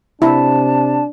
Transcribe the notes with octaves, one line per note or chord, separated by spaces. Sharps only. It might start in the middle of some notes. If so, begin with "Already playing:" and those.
C3 D4 E4 A5